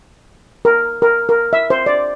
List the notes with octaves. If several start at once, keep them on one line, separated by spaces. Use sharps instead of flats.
A#4
A#4
A#4
E5
C5
D5